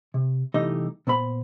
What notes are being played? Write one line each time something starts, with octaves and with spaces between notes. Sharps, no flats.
C3
C2 E3 A3 D#4 G4 D#5
A#2 B3 C5 B5